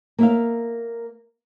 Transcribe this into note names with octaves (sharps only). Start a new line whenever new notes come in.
A#3 E5 F5